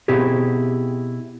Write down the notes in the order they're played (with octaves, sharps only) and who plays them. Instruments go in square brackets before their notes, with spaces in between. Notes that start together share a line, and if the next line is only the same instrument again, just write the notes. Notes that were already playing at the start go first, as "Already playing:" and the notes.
[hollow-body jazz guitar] B2 C4 E4 G4 G#4